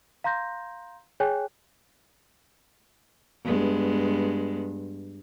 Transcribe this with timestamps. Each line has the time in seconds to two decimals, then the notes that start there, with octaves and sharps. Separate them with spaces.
0.24 F5 A#5 C6 G6 A#6
1.20 G#4 C#5 G5 G#5 F#6
3.44 G2 G#3 B3